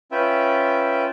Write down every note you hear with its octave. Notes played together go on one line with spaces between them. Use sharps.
C#4 F4 B4 E5 G5